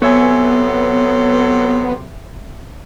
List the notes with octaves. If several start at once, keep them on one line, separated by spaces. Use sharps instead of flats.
C3 F#3 B3 A4 C#5 E5 G#5